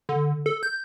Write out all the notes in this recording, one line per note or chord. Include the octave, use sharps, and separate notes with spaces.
D3
A4
G6